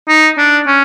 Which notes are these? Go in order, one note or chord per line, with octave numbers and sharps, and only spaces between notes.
D#4
D4
C#4